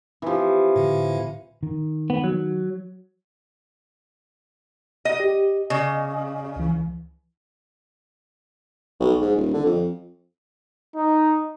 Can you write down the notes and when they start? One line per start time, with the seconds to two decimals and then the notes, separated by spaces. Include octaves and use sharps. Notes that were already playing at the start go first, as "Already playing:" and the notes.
0.22 E3 F3 C4 G4
0.76 A2 D3
1.63 D#3
2.10 B3
2.24 F#3
5.05 D#5
5.20 G4
5.70 C#3 D5 D#5
6.56 C#2 E3
9.00 B1
9.20 G#2
9.36 D#1
9.54 D3
9.65 F2
10.96 D#4